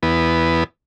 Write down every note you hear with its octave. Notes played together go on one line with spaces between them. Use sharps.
E2 B3